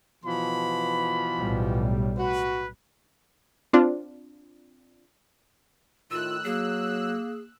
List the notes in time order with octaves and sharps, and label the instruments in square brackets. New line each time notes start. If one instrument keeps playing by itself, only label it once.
[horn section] B2 E3 F3 [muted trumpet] B5
[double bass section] B1 A2 G3
[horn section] F#4 [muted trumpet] B4
[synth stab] C4 D4 F4
[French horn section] A2 D#3 [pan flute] F4 [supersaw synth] E6 F#6
[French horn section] F#3 [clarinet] A#3 [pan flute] G#4